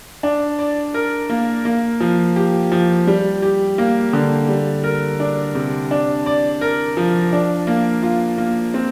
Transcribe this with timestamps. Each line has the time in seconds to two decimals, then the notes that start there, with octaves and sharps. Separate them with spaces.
0.23 D4
0.59 D5
0.94 A#4
1.30 A#3
1.65 A#3
2.00 F3
2.36 G4
2.72 F3
3.07 G3
3.42 G4
3.78 A#3
4.13 D3
4.49 G3
4.84 A#4
5.20 D4
5.55 C3
5.91 D4
6.26 D5
6.61 A#4
6.97 F3
7.33 D4
7.67 A#3
8.03 F4
8.38 A#3
8.74 C4